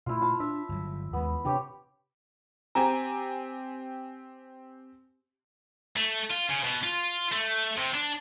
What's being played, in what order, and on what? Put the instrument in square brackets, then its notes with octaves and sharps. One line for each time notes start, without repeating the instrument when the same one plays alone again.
[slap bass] A#2 A3 [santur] E4 F4
[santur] F4 A5
[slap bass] D4 [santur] E5
[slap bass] G1 F#3
[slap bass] D#2 G#3 [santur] B3
[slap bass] C3 D4 [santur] C4 G4 C#5
[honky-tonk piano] C4 G4 G#5 [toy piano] A#5
[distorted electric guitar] A3
F4
C#3
B2
F4
A3
C3
D4